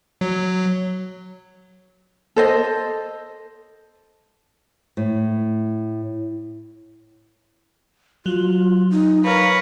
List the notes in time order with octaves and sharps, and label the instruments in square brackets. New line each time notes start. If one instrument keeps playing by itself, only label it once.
[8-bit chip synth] F#3
[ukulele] A4 C5 D#5
[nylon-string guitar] A2
[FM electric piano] F#3 [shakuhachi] F4
[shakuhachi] D#4
[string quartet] A#4 B4 C#5 [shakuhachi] F5